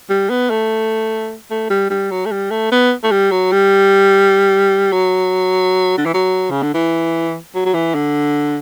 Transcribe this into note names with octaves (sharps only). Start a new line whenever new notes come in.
G3
B3
A3
A3
G3
G3
F#3
A3
G3
A3
B3
A3
G3
F#3
G3
F#3
D3
E3
F#3
C#3
D3
E3
F#3
F#3
E3
D3